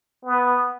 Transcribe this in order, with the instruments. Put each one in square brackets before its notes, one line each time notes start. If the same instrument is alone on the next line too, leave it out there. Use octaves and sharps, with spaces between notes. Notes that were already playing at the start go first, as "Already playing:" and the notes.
[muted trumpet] B3